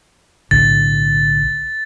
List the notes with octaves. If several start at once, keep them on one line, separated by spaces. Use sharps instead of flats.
B1 A2 D3 A6